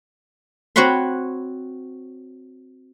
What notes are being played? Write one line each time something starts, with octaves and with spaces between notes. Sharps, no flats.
C4 F#4 C#5 F#5 B5 C6